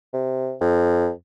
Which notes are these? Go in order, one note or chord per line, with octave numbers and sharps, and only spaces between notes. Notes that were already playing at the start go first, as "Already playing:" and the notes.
C3
F2